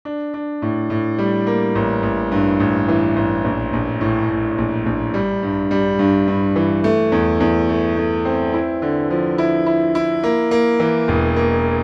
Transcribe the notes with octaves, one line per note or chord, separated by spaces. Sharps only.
D4
D4
A2
A2
G3
A#3
A1
A1
G2
A1
E3
A1
A#1
A#1
A2
A2
A#1
A#1
G3
G2
G3
G2
G2
E3
A3
E2
E2
A3
A3
C4
E4
D3
F3
E4
E4
E4
A#3
A#3
E3
E1
A#3